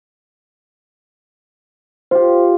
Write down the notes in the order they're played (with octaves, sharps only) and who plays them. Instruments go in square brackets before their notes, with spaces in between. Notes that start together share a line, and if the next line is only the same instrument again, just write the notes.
[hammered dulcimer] F4 G4 [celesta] C5